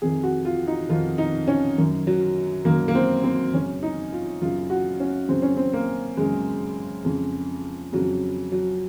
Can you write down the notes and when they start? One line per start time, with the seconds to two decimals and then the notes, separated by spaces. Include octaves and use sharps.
0.02 F2 C3 D#3 G#4
0.23 F#4
0.45 F4
0.67 D#4
0.89 F2 C3 D#3 F4
1.18 D#4
1.47 C#4
1.78 F#2 D#3
2.07 F#3
2.65 F#2 D#3 A#3
2.88 A#3
2.95 C4
3.24 C4
3.54 F#2 C#3 C#4
3.83 D#4
4.12 F4
4.42 F#2 C#3 F4
4.70 F#4
5.00 C#4
5.29 F#2 C#3 C4
5.42 C#4
5.57 C4
5.73 A#3
6.17 F#2 C#3 G#3
7.05 F2 C#3
7.93 F2 C#3 F#3
8.52 F#3